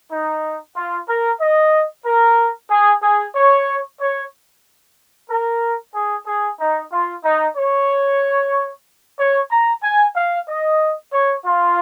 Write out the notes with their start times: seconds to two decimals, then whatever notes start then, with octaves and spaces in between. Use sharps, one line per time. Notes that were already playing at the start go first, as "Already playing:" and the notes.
0.12 D#4
0.76 F4
1.09 A#4
1.41 D#5
2.06 A#4
2.71 G#4
3.02 G#4
3.35 C#5
4.01 C#5
5.30 A#4
5.95 G#4
6.27 G#4
6.60 D#4
6.92 F4
7.24 D#4
7.57 C#5
9.19 C#5
9.51 A#5
9.83 G#5
10.16 F5
10.48 D#5
11.13 C#5
11.45 F4